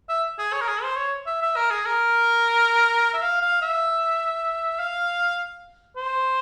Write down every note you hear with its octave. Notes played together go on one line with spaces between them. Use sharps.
E5
G#4
C#5
A#4
G#4
C5
C#5
E5
E5
A#4
G#4
A#4
E5
F5
F5
E5
F5
C5